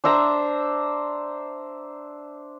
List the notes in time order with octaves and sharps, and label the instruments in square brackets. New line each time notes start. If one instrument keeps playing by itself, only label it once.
[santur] D4 C5 E5 A#5